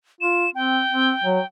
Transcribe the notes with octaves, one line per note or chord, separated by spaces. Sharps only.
F4 E7
C4 G5
C4
F#3